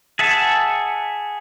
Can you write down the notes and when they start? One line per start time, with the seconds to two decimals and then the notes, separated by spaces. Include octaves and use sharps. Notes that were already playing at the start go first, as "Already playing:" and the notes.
0.19 G#4 E5 F#5 A5